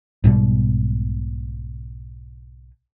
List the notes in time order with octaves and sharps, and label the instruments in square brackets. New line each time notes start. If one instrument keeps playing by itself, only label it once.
[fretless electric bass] B1 G#2 B2 G3